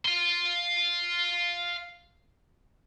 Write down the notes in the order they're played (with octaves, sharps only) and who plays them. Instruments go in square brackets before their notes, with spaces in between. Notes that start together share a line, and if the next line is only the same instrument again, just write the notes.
[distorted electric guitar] F5 C6